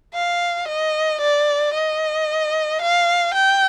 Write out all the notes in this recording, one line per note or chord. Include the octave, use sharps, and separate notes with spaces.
F5
D#5
D5
D#5
F5
G5